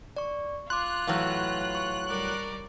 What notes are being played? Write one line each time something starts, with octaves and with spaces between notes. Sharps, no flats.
D5 C#6
F4 C6 D6 F#6
A2 E3 F#3 F5 C#6 F6
C#6
G3 A#4 D5